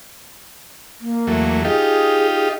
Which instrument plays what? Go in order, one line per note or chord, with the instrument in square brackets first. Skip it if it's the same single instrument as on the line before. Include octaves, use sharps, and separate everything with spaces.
[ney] A#3
[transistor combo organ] E2 F#3 A3
[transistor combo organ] D#4 F4 G4 [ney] G#4